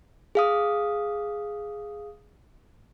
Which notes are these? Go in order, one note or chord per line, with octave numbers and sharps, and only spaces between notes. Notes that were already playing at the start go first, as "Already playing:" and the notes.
G#4 F5 D#6